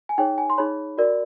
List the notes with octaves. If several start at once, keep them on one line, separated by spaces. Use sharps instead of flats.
G#5
D#4 G#4 C#5 G5
G#5
C6
D#4 G#4 C#5 B5
F#4 A#4 D5